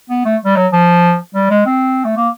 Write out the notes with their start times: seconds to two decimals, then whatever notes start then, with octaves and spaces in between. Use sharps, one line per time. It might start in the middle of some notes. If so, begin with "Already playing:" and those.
0.10 B3
0.25 A3
0.45 G3
0.56 F#3
0.73 F3
1.35 G3
1.50 G#3
1.66 C4
2.05 A3
2.17 A#3